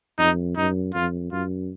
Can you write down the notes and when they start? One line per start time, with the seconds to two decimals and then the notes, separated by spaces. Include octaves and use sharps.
0.18 F2 D#4
0.57 F#2 D#4
0.94 F2 F4
1.31 F#2 F4